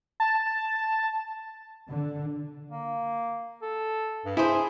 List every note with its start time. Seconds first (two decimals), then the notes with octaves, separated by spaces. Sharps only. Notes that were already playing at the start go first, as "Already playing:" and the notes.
0.20 A5
1.88 D3
2.71 A#3
3.62 A4
4.25 G2
4.37 E4 G#4 C5